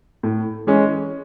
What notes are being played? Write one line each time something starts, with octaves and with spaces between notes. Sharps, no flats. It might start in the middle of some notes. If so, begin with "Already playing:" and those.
A2
E3 G#3 C#4